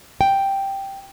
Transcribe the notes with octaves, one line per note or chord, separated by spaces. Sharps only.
G5